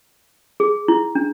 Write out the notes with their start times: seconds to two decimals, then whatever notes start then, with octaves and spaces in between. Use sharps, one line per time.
0.60 G#4
0.88 E4
1.15 D4